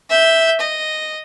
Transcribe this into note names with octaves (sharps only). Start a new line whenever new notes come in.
E5 G6
D#5